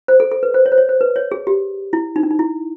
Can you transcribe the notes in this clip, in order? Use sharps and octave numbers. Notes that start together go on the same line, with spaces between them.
C5
A4
A4
B4
C5
C#5
C5
C#5
C5
B4
C#5
G#4
G4
E4
D#4
D4
D#4
E4